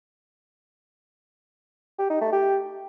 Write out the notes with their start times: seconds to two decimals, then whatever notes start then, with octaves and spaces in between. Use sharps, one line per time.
1.99 G4
2.10 D#4
2.21 A3
2.32 G4